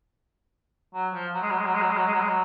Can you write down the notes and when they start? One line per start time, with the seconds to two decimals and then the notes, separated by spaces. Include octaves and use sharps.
0.94 F#3
1.14 F3
1.34 F#3
1.42 G#3
1.50 F#3
1.58 G#3
1.66 F#3
1.74 G#3
1.81 F#3
1.90 G#3
1.97 F#3
2.06 G#3
2.13 F#3
2.21 G#3
2.28 F#3